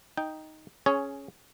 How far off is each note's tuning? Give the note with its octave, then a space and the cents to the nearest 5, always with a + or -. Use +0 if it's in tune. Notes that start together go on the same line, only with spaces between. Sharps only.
D#4 +0 G5 +0
C#4 +0 G#4 +15 C#5 +5